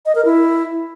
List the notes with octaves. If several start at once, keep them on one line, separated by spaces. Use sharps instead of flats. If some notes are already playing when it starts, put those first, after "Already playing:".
D#5
A#4
E4